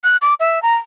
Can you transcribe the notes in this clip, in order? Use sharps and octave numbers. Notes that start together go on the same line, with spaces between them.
F#6
D6
E5
A#5